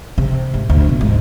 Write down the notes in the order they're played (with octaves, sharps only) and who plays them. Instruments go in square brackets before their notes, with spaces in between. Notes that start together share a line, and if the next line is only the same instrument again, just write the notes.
[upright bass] C3
G#2
D2
B2
G#2